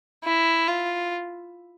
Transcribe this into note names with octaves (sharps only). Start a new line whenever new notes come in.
E4
F4